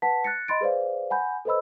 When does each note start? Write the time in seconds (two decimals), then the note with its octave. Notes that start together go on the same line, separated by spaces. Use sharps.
0.02 B4 F#5 A5 B6
0.24 F#6 A6 A#6 C#7
0.48 D#5 B5 C6 A6 D7
0.61 G#4 B4 C5 D5 F5
1.10 F#5 G#5 B5 G6
1.45 A4 B4 C5 D#5 B5 E6